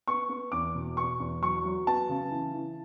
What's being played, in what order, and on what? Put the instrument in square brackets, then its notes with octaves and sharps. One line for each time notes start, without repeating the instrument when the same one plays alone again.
[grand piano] B3 C#6
B3
E2 D6
B2
B3 C#6
E2
F#3 C#6
F#3
B3 A5
C#3
E3
E3